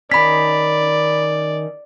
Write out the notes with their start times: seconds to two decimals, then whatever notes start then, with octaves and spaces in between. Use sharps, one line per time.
0.11 D#3 C#4 D5 B5 B6